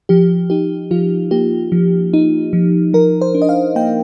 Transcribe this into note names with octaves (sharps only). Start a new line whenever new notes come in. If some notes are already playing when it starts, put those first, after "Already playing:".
F3 G4
D#4 G4
F3 F4
A#3 G4
F3
D#4
F3
F3 A#4
C5
D4
D#5
F5
A#3 G5